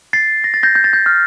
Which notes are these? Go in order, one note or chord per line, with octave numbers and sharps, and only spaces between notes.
A6 C7
A#6
A6
G6 A#6
G6
A6
G6
F6